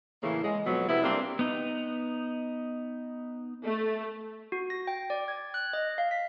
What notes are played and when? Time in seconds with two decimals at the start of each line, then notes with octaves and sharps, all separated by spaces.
0.23 A2 C#3 E3 A3 A#3
0.44 G#3
0.66 F2 B2 F3 F#3 B3
0.89 C3 B3 E4
1.03 G3 A#3 C4 D4
1.39 B3 D#4
3.64 A3
4.52 F#4
4.70 A#6
4.87 G5
5.10 D5
5.28 G#6
5.54 F#6
5.73 D#5
5.98 F5
6.11 B6